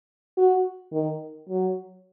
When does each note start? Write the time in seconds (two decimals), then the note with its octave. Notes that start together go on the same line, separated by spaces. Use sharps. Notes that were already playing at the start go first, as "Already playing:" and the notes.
0.38 F#4
0.93 D#3
1.49 F#3